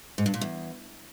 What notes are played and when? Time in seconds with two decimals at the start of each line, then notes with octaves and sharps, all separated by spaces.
0.18 G#2
0.26 G2
0.34 A#2
0.41 E2